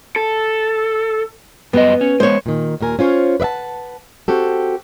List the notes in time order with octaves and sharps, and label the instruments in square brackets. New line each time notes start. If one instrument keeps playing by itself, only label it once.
[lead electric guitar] A4
[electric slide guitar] F#2 G3 D#5 [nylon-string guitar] B3
[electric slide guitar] C#4
[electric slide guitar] G#3 B3 [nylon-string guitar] C5 C#5
[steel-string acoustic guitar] A#2 D#3
D#2 A#2 A#4 G#5
C#4 F4 C5 C#5
B4 D5 E5 F#5 A5
C4 F#4 G4 A4